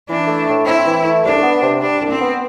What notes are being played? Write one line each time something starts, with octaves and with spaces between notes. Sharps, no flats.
E3 D4
A3
A2
C4 E4
E3
A3
C2 D4
B3
C3
G3 D4
C2
C4
B3